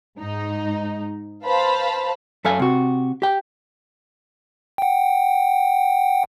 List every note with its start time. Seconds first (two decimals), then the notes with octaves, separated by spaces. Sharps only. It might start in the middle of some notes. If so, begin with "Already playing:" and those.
0.19 G#2 D#4
1.44 B4 C5 F5 A5 B5
2.45 F#2 A4 E5 F5 G#5
2.59 C3 F#4
3.22 G4 G5
4.78 F#5 G5